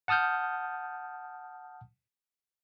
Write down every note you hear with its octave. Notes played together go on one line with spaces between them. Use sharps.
F#5 A5 D#6 F6 G6